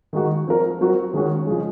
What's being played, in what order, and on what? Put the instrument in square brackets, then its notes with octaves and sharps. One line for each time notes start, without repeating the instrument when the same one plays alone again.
[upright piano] D#3 G#3 D#4 F#4
F3 C4 F4 A#4
F#3 C4 F#4 A#4
D#3 G#3 C#4 F#4
C#3 F3 G#3